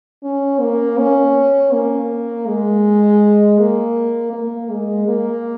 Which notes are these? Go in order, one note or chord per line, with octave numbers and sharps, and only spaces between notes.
C#4
A#3
C#4
A#3
G#3
A#3
A#3
G#3
A#3